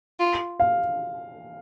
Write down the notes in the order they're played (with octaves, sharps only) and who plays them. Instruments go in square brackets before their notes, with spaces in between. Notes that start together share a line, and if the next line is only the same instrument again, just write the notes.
[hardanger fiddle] F4
[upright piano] F5